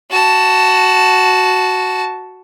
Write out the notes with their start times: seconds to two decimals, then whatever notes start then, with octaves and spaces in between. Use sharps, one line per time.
0.11 F#4 A5